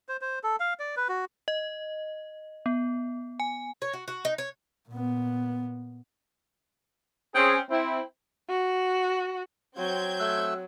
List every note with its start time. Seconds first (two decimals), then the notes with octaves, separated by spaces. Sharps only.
0.09 C5
0.21 C5
0.44 A4
0.60 F5
0.79 D5
0.97 B4
1.09 F#4
1.48 D#5
2.66 B3
3.40 G#5
3.82 C#5
3.93 F#4
4.08 F#4
4.25 D#4
4.38 C#5
4.89 A#2 B3
7.35 C4 C#4 G#4
7.70 C4 E4
8.49 F#4
9.78 F#3 C4 G6 G#6
10.20 A3 E6 F#6